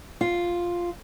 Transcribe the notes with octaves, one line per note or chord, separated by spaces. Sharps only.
F4